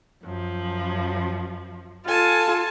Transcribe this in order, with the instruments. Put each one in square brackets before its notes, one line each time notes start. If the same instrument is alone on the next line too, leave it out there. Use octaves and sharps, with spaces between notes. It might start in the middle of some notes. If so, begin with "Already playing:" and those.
[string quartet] F#2 F3
[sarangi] F4 [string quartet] A4 G#5 A5